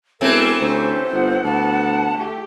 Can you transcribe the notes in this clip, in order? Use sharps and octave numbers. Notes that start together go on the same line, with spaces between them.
E1 E3 A3 C4 A#4
D2 C#4 G4 C5
G1 B3 F#5
D2 A5
A3 G4